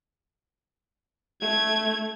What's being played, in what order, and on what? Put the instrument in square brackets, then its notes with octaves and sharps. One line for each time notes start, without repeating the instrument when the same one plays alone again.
[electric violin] A3 G#6